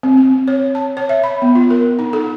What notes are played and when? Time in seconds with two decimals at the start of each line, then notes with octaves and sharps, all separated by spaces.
0.03 C4
0.17 C4
0.48 C#5
0.75 A5
0.97 C#5
1.09 E5
1.24 B5
1.42 B3
1.55 F4
1.70 A#4
1.99 D#4
2.13 A4